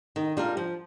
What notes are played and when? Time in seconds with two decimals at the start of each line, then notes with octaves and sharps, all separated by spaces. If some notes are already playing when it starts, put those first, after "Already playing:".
0.16 D#3
0.37 G3 D4 F4 A#4
0.57 F3